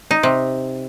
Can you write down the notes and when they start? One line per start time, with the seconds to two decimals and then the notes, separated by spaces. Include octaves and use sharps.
0.11 D#4
0.23 C3